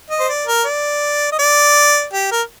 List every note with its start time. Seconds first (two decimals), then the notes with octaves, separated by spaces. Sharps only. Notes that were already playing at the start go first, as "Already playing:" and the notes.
0.10 D#5
0.20 C5
0.29 D5
0.46 A#4
0.65 D5
1.32 D#5
1.39 D5
2.13 G4
2.31 A#4